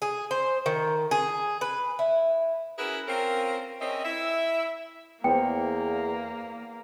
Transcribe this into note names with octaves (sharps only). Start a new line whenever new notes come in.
G#4
C5
D#3
G#4
B4
E4
C#4 E4 F#4 G#4 A#4 B4
C4 C#4 F4 A#4
C4 C#4 G#4 A#4 D#5 E5
E4 E5
E2 A#3 B3 C5 G5